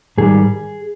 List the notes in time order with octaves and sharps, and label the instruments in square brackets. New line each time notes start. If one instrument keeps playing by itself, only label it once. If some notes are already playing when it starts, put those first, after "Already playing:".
[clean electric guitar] G#2 D#3 G3 G#4